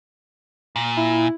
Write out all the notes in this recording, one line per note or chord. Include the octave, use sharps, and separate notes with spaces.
A#2
E4